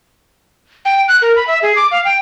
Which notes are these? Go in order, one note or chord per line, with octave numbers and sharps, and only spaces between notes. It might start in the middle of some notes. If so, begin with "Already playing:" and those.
G5
F#6
A#4
B5
E5
G#4
D6
F5
G5